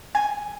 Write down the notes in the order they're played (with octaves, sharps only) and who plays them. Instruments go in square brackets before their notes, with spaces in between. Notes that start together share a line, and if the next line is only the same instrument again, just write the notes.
[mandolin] G#5